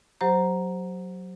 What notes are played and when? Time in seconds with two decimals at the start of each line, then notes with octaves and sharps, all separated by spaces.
0.21 F#3 G4 C5 A#5